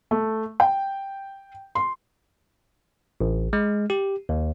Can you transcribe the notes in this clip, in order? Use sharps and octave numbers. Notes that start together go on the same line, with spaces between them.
A3
G5
C6
A1
G#3
G4
D#2